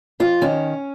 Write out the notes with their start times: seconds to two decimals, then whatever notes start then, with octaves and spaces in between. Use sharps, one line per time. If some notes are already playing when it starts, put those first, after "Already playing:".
0.20 F2 F4
0.41 D#3 C#4